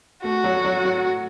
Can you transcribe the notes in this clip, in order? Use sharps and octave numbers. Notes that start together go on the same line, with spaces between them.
A3 F#4
F#3
F#3
F#3